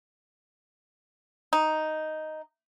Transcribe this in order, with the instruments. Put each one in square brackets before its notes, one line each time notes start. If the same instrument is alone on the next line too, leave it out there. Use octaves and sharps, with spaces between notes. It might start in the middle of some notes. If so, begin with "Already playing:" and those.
[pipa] D#4